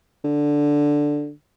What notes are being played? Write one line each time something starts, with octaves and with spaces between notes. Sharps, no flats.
D3